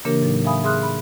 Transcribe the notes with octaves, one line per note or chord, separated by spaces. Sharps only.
C#3 E3 A#3 D4 G4 A#4
A2 F#3 D#4
E5 F5 G#5 B5 D#6
G#4 E5 C6 D#6 F6 F#6
B5